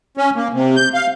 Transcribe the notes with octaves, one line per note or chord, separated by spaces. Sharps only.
C#4
A#3
C3
G6
F5